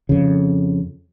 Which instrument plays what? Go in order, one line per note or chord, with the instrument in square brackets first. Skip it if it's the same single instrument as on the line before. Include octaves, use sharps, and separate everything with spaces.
[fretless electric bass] F2 C#3